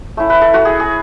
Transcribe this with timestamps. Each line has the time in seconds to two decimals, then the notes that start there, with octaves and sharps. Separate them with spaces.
0.17 A3 C#4 E4
0.30 B4
0.41 A4
0.54 F#4
0.65 G#4
0.79 G#4